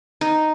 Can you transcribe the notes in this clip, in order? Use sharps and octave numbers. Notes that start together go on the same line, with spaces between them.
D#4